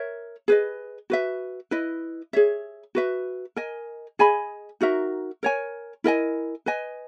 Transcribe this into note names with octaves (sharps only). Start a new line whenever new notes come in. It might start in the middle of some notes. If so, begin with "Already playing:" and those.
Already playing: A#4 C#5 E5
G#4 B4 D#5
F#4 B4 E5
E4 B4 D#5
G#4 C#5 E5
F#4 B4 E5
A#4 D#5 G#5
G#4 D#5 G#5 B5
D#4 F#4 A#4 E5
A#4 C#5 G#5
E4 A#4 D#5 G#5
B4 D#5 G#5